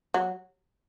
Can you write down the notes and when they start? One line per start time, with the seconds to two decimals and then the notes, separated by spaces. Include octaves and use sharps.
0.14 F#3